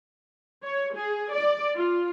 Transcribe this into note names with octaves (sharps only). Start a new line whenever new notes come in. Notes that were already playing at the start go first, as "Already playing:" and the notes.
C#5
G#4
D5
F4